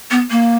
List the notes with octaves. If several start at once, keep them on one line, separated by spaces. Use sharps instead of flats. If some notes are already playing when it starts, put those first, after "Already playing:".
B3
A#3